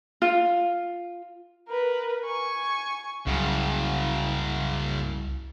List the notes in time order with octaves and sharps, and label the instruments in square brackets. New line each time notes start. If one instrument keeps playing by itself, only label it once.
[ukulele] F4
[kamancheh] A#4 B4
G#5 C#6
[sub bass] C2 [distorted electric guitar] F#2 C#3